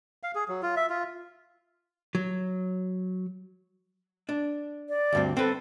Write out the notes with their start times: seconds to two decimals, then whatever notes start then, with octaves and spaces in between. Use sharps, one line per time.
0.23 F5
0.35 G#4
0.48 F#3
0.63 F4
0.76 E5
0.90 F4
2.15 F#3
4.29 D4
4.89 D5
5.12 D2 G2 C4
5.37 C4 A4 B4